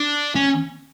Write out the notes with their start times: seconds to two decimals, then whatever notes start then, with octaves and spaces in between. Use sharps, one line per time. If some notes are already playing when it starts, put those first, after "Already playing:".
Already playing: D4
0.35 C#4